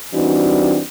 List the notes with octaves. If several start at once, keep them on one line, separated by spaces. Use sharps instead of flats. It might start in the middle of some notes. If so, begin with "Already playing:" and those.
E3 G3 C4 D4 D#4 F#4